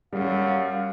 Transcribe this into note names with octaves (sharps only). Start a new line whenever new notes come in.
F#2 G3 F5